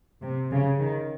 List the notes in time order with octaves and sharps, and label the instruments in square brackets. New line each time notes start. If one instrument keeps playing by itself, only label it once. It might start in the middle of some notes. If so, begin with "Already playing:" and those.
[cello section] C3
C#3
D#3